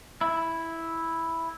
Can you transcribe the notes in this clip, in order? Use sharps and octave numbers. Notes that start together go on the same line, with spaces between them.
E4